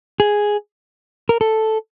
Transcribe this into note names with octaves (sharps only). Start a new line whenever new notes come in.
G#4
A#4
A4